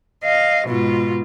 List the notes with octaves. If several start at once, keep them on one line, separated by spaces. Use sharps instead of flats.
D#5 F5
G#2 B2 F4